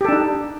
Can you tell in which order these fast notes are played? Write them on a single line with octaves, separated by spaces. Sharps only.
G4 A4 D4 D#4